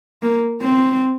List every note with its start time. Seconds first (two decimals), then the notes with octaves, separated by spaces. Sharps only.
0.23 A#3
0.62 C4